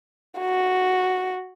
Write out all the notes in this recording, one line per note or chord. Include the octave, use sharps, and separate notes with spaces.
F#4